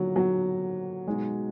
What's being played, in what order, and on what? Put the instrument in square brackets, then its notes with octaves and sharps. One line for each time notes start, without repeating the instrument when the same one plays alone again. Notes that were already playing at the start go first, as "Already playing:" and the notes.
Already playing: [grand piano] D3 F3 A#3 D#4 [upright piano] F#3
[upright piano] F#3
[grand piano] B2 G#3 D#4